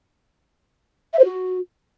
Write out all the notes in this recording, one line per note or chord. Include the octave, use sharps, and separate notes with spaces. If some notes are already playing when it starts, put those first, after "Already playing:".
E5
C5
F#4